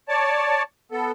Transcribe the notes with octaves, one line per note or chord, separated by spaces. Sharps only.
C#5 D5 A5
B3 A4